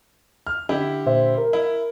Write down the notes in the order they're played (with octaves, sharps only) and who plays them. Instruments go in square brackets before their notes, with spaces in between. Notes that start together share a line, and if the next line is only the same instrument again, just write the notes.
[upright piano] F6
D3 E4 G4
[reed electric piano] A#2 C5 E5
A#4
[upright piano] E4